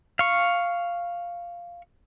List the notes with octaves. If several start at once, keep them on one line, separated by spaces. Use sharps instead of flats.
F5 C#6